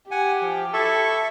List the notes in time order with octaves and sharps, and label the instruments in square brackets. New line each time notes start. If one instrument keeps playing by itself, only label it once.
[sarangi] G4 [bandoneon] F#5 G#5
[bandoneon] F3
[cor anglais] E4 [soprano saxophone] A4 [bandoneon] E5 C#6